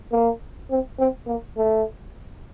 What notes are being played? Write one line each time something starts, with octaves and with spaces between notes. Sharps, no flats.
A#3
C4
C4
A#3
A3